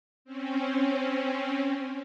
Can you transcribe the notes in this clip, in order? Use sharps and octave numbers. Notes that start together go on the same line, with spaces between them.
C4 C#4